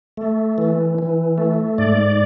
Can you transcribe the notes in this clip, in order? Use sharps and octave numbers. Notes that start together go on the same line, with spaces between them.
A3
E3
E3
A3
G#2 D5